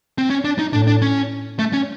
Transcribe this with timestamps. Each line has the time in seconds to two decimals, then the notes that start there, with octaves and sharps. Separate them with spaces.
0.18 C4
0.30 C#4
0.44 D4
0.59 D#4
0.73 A2 D4
0.87 D4
1.02 C#4
1.59 A3
1.73 C#4